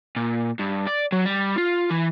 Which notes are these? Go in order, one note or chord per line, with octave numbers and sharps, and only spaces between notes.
A#2
G2
D5
F#3
G3
F4
E3